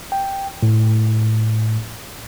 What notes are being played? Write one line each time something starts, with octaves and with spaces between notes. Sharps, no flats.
G5
A2